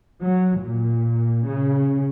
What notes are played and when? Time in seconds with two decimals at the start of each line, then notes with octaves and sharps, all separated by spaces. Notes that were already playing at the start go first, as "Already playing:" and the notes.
0.22 F#3
0.61 A#2
1.48 C#3